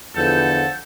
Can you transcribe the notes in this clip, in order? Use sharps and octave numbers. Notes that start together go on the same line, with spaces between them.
E2 D3 F3 A4 F#5 G6